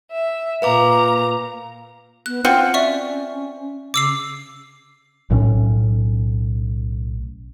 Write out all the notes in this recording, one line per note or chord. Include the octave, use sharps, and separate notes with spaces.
E5
A#2 B4 F5 A#5 D6
B3 F#6
C4 C#4 F4 F#4 C#7
D5 E5 C#6
C#3 D6 E6 C7
B1 A2 F#3 C#4